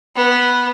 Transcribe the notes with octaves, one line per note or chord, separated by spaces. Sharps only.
B3